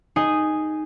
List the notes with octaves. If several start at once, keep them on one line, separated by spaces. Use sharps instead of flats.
D#4 G#4 D#5 G#5